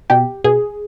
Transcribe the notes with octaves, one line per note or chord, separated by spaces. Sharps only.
B2 G4
B2 G#4